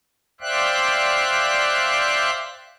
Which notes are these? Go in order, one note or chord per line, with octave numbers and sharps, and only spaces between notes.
C5 D5 E5 F5 G5 F#6